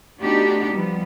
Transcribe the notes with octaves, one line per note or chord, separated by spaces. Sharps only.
A3 B3 D4 D#4 F#4 G4
F3 G3 B3